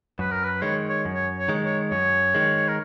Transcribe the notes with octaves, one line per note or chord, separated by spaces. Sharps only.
F#2 B4
A#4
B4
D#3 G#3 C#5
C#5
F#2
C#5
C#5
D#3 G#3
C#5
F#2 C#5
D#3 G#3
A#4